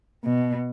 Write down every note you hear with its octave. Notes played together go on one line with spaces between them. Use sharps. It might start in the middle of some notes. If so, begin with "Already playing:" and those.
B2